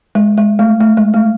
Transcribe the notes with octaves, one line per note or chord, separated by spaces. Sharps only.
G#3
G#3
A3
A3
G#3
A3